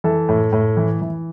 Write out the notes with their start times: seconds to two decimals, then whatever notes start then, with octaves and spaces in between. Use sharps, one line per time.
0.04 E3 A4
0.29 A2
0.52 A2
0.77 E3
1.01 E3